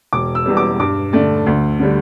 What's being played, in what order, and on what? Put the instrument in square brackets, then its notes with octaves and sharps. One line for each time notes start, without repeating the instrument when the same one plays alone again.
[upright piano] E1 D6
E6
E2 B2 G3
D6
G2 D6
D3 A3 D5
D2
D3 G3